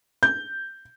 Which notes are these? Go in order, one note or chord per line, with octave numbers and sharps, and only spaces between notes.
G6